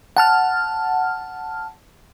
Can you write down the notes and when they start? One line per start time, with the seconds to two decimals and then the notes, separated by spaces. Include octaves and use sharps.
0.17 F#5 A5 F6